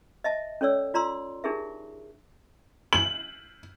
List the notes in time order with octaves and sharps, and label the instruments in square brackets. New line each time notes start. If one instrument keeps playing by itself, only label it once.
[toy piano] D#5 E5 A5
C#4 A4 C#5 D5 E6
F4 D5 A#5 C6 E6
D4 D#4 G4 G#4 A#4 E5
[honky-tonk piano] F#7